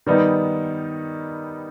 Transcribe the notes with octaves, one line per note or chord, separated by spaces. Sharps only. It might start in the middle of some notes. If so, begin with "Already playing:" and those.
D#3 G3 B3 D#4